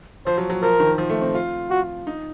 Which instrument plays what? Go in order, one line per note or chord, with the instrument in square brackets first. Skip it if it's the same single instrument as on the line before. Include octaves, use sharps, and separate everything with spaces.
[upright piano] F3 [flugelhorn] C5
[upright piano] F#3
F#3
[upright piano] F3 [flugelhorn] A#4
[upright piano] D#3
F3
A3
C4
F4
[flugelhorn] F#4
[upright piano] D#4